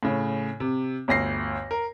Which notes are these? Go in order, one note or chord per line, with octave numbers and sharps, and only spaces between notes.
A2 C#3
C3
G1 D2 A#6 C7
A#4